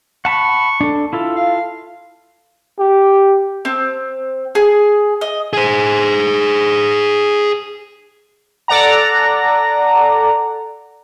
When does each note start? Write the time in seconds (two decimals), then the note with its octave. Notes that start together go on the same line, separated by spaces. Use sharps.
0.25 F#5 A5 B5 C#6
0.81 D4 A4
1.13 E4 F4 A4
1.36 F5
2.79 G4
3.65 C4
4.55 G#4
5.21 D#5
5.53 G#4 C5
8.68 A4 D5 F#5 A#5